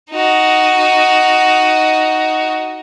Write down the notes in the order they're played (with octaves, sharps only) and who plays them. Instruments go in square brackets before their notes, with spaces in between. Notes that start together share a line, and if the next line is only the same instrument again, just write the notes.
[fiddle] D#4 F#4